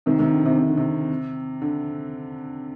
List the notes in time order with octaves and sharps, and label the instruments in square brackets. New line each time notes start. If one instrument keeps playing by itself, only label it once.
[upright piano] C3 D#3
C3 D#3
D3
C3
C3
D3
C3
D3